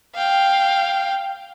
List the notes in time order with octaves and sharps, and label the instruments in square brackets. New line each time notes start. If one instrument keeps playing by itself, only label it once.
[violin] F5 G5